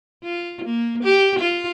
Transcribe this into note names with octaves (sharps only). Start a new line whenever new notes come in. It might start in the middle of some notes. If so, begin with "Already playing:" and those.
F4
A#3
G4
F4